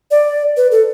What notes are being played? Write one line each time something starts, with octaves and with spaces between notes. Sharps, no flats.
D5
B4
A4